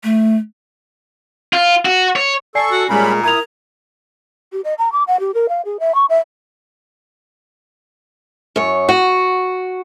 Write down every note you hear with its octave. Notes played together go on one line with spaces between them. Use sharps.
A3
F4
F#4
C#5
A4 D5 G#5 C#6 C7
F#4
A#2 G3 G#3 C#4 B5
E4 A#4 A#5 D#6 G#6 F7
G4
D#5
A#5
D6
F#5
G4
A#4
F5
G#4
E5
C#6
E5
F#2 C#5
F#4